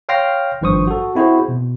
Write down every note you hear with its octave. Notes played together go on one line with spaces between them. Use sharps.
C#5 F5 G5 C6 F6 A#6
G#1 G2 F3 C5 C#6 D#6
F#4 A4
C4 E4 F#4 G#4 C5
B2